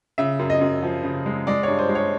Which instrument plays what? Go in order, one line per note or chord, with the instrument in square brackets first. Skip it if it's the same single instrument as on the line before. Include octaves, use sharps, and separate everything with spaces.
[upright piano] C#3 E5
F#2
D#5
F#2
F3
C#3
G#3
G#3 D5
G2 C#5
C5
G#3
C#5